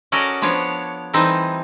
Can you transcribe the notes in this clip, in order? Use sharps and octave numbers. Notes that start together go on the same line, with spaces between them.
C#4 F#4 A4 A#4 D5 D#5
F3 B3 D4 C#5
E3 G3 C4 D#4 A4